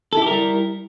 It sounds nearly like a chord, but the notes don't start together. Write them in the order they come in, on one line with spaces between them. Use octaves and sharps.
A4 E4 G4 A#4 G3